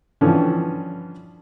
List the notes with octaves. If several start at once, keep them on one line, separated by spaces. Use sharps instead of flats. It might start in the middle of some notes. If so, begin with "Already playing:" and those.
G2 D3 E3 F3 C#4